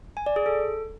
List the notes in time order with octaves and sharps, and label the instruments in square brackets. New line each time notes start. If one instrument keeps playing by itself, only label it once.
[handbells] G#5
D5
G#4
A4